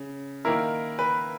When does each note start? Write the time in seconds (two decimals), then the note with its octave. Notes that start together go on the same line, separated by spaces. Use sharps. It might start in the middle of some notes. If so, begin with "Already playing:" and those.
Already playing: C#3
0.45 D#3 A#3 E4 A#4
0.99 B4